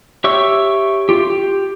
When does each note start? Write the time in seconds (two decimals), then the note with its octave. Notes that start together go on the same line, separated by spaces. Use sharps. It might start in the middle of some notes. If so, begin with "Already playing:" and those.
0.24 G4 C#5 E5 C#6 E6
1.09 F4 G4
1.30 G4